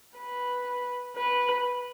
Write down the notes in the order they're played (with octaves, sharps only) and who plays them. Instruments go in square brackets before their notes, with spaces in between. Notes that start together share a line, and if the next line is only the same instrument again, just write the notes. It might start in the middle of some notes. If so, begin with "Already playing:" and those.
[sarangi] B4
B4